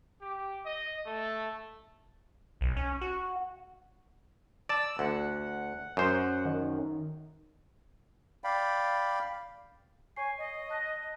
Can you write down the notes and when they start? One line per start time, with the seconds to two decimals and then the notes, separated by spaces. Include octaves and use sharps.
0.21 G4
0.66 D#5
1.06 A3
2.61 B1
2.77 C#4
3.01 F#4
4.69 D5 A5 E6
4.99 D2 F#5
5.97 F#2 C5
6.45 D#3
8.44 D5 F5 G5 B5
10.16 C#5 G#5 C#6 C7
10.38 D#5
10.70 A5 F#6 A#6